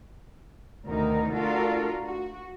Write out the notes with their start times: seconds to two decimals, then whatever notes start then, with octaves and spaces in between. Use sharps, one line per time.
0.85 D2 B2 D#3 D#4 A#4
1.32 A3 D4 F4 F#4 A4 A#4
2.01 F#4